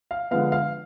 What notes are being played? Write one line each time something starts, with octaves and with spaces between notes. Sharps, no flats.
F5
D3 F3 G#3 B3 F5
F5